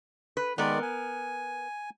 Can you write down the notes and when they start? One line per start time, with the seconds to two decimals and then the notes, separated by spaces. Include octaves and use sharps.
0.37 B4
0.58 D#3 G#3 B3 A#4 D5
0.82 G#5